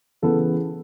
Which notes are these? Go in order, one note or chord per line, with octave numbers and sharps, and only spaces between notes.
C#3 E3 B3 A4